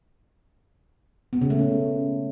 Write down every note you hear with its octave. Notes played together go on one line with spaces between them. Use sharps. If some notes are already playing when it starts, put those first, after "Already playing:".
B3
C#3
A3
C#4